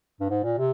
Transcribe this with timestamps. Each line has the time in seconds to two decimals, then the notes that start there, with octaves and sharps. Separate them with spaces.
0.20 G2
0.30 G#2
0.44 A#2
0.58 C3